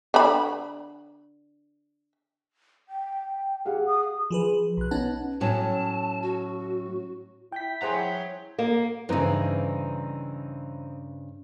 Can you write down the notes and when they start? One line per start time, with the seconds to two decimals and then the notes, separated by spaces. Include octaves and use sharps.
0.14 D3 B5
2.89 G5
3.65 G4 G#4 F5 F#5
3.86 D#6
4.31 F3 G#4 B4
4.77 B1 F#6
4.91 B3 C#4 D#4 B4 F#5 A5
5.41 A2 F#3 C#4 A5
6.22 F#4
7.52 E4 G5 G6 B6
7.82 G#4 C5 C#5 F#5 A#5
8.59 A#3
9.09 G2 C#3 E3 C4 D#4